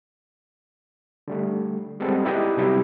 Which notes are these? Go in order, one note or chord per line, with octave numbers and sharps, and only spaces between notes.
D3 G3 A3
G3 G#3 B3 C4 A4
D#4 E4 G4 B4 D5 D#5
C3 F#3 G3 B3 E4 G4